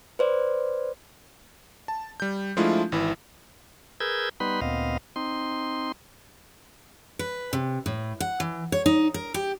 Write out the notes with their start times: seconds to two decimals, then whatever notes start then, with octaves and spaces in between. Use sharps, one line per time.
0.19 B4 C5 D5
1.88 A5
2.20 G3 G6
2.57 F3 G#3 A3 D4 E4 F4
2.92 G#1 E3 E4
4.00 G#4 A#4 B4 E6 G6 G#6
4.40 G3 B3 D#4 B4 B5 C6
4.61 D2 A#2 B3 C4 D#5 F5
5.16 C4 D#4 C6
7.19 B4
7.53 C3
7.86 A2
8.20 F#5
8.40 E3
8.72 C#5
8.86 D#4
9.14 A#4
9.34 G4